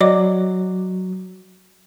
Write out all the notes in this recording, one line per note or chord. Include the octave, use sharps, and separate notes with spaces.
F#3 D5 D#5 D6